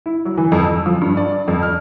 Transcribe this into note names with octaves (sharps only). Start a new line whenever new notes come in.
E4
F#3
E3
F2
E6
F3
G2
D5
F2
F6